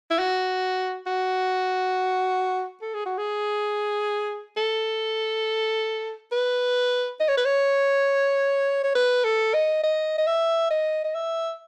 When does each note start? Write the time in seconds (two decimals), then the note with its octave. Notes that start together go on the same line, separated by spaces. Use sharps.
0.10 E4
0.19 F#4
1.07 F#4
2.82 A4
2.94 G#4
3.06 F#4
3.18 G#4
4.57 A4
6.32 B4
7.20 D#5
7.28 C#5
7.37 B4
7.45 C#5
8.84 C#5
8.95 B4
9.24 A4
9.54 D#5
9.83 D#5
10.18 D#5
10.27 E5
10.71 D#5
11.04 D#5
11.15 E5